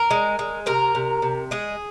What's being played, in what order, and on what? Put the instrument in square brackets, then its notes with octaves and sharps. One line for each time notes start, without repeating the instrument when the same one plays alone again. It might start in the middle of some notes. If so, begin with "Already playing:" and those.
Already playing: [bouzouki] A#4
G#3
G#3
C3 A#4
C3
C3
G#3 G#4